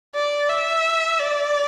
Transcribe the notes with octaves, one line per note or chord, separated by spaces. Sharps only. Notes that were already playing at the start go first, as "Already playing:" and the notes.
D5
E5
D5